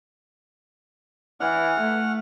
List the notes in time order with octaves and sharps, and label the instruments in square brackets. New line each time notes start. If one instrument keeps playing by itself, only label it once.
[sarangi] E3 [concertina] F#5 F6
[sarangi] A3